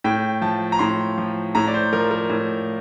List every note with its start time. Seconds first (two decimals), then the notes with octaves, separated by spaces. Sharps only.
0.04 A2 G5
0.41 F3 A5
0.72 A#5
0.79 A2 C6
1.18 F3
1.55 A2 A#5
1.67 D5
1.74 C5
1.93 F3 A#4
2.11 A#4
2.30 A2